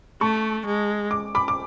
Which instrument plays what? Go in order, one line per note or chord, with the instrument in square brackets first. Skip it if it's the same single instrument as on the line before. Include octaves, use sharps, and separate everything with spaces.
[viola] A3 [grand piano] A5 C#6
[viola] G#3
[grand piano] D6
B5 D6
D6